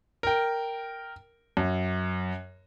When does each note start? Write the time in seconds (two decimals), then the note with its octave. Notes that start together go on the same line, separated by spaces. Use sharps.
0.23 A#4 G5
1.57 F#2